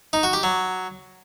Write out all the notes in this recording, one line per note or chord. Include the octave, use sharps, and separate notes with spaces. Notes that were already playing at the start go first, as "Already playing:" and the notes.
D#4
F#4
G4
F#3